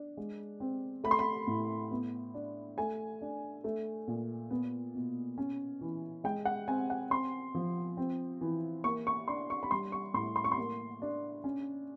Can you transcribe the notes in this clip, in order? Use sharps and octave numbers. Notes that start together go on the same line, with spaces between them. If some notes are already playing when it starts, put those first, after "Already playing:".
Already playing: D4
G#3
C4
A3 B5
C6
B5
A2
B3
D4
A3 G#5
D4
A3
A#2
B3
B2
C#4
E3
G#3 G5
F#5
C4 G#5
F#5
C4 C6
F3
C4
E3
A#3 C#6
C#6
D4 C6
C#6
B5
G3 C6
C#6
A2 C6
C6
C#6
C6
A#3
D4
C#4